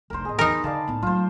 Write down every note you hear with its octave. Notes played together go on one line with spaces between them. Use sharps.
F1 D4 A#4 C5
A2 B3 G#4 D#5
E2 E3 D#4 A#4 C5 B5
D3 D5 F5 A5
A2 B3
F#3 A3 F4 C5